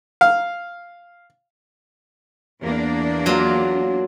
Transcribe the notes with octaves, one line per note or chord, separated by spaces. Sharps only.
F5
E2 A#3 D4
F#3 F4